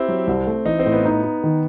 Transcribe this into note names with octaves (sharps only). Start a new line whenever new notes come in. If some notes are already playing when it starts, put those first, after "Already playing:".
Already playing: C4 E4 G4
F#3
C2
A3
E3 D#4
C4
A2
B3
D#4
D#4
D#3